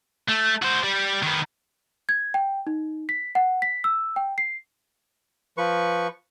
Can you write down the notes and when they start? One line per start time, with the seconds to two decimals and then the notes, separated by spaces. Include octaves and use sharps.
0.28 A3
0.62 F#4 C5
0.83 G3 G4
1.23 D#3 B3
2.09 G#6
2.34 G5
2.67 D#4
3.09 B6
3.35 F#5
3.62 B6
3.84 E6
4.16 G5
4.38 C7
5.58 F3 B4 C#6